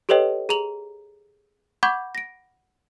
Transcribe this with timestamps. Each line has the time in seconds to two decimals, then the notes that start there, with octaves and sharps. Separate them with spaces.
0.09 G4 A4 B4 C#5 D#5 G5
0.49 G#4 A#5 F7 F#7
1.83 F#5 B5 C#6 D6 G6 G#6
2.15 A#6 D7